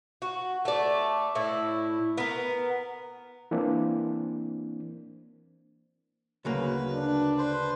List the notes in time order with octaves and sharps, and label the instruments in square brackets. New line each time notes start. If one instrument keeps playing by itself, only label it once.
[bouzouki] F#4
A3 D5
A2 E4
B3 A#4
[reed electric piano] E3 A#3 C4 D4
[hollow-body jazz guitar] D2 C#3 A#3 [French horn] F#3 [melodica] B4
[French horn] D4
[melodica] B4 C5